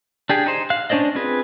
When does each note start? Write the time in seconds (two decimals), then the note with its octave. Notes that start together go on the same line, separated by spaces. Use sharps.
0.29 D4 G4 G#4
0.46 D#4 C5
0.70 F5 F#6
0.90 C#4 D4 C5 D5 D#5
1.15 C4 F4 G#4 B4